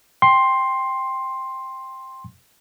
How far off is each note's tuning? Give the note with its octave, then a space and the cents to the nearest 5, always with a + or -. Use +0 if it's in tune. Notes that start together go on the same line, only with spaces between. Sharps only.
G5 +0 C6 +10